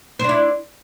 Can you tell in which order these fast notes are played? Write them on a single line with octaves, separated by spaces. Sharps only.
C5 D4 E4